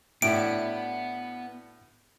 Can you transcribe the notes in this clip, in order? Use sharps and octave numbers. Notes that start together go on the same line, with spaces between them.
A2 B3 D4 E4 F#4 D7